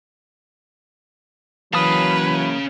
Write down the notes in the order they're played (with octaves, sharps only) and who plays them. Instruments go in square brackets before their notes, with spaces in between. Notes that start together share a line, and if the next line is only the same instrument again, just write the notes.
[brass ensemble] E3 F#3 [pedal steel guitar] A#3 A5 D#6 [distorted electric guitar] C#4 F5 [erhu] B4